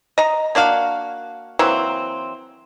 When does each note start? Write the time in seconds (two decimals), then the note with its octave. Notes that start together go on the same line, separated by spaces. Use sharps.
0.18 D#5 A#5
0.55 A#3 D4 F#4 F5
1.59 E3 F#3 A#3 C4